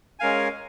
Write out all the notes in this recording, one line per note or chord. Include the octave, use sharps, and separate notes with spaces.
G#3 C#4 A#4 F5 G#5